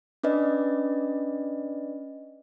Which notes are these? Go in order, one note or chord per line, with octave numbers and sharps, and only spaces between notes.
C#4 D4 B4 D5 D#5